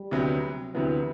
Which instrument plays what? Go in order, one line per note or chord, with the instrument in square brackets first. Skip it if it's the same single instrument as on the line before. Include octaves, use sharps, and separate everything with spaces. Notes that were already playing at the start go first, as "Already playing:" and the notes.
Already playing: [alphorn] G3
[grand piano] D2 C3 F#3 B3
[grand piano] D2 C3 F#3 B3 [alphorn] E3